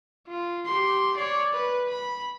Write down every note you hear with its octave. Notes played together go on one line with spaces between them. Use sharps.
F4
G4 C6
C#5 D5
B4
B5